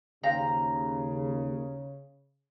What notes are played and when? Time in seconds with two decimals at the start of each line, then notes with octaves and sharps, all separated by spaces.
0.23 D#2 C#3 C5 F5 G5 A#5